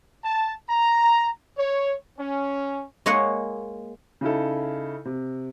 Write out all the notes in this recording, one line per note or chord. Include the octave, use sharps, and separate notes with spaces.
A5
A#5
C#5
C#4
G#3 A#3 C#5 D#5 F#5
C#3 D#4 E4 A4
C3